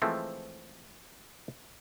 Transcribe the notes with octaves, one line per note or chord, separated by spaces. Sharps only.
E3 F3 G#3 A3 C4